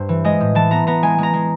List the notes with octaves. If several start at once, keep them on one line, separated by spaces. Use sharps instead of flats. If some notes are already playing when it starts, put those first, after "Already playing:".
Already playing: G2 C5
E3
G#3 D#5
A2
E3 A5
B3 A#5
B3 A#5
G#3 G#5
G#3 A#5
G#3